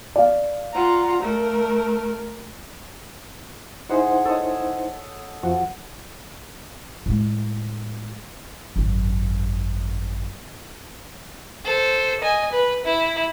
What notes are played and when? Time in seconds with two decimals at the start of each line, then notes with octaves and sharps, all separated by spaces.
0.16 D5 F5
0.74 F4 F#5 A#5
1.21 A3 A#4
3.89 D#4 E4 G#4 C5 F#5
4.25 A4 C#5 D#5
5.43 F2 F3 F#4
7.06 A2 G#3
8.76 G#1 F#2
11.65 A4 C5
12.21 D#5 G#5
12.52 B4
12.85 E4